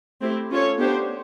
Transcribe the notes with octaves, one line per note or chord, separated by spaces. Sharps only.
A3 C4 E4 G4
C#4 F4 A4 C#5
B3 D4 G4 C5